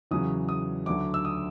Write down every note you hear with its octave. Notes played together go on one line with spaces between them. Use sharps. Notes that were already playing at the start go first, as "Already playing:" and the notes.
E2 C#3 F#3 D#6
D#6
D2 D3 F#3 D6
E6
D#6